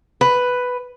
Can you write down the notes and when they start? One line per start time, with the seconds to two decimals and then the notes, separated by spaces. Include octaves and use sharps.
0.21 B4